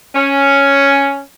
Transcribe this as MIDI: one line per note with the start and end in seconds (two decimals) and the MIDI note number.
0.15 1.22 61